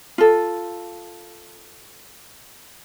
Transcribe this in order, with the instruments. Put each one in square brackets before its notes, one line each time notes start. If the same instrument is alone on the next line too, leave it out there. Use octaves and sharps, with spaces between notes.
[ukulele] F4 A4